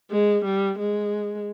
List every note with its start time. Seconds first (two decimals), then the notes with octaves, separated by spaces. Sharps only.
0.10 G#3
0.44 G3
0.78 G#3